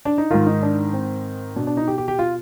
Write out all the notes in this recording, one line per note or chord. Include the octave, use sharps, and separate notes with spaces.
D4
D#4
G#2 D#3 F4
D#4
D4
C4
B2 D4
D4
D#4
G4
G4
G4
F4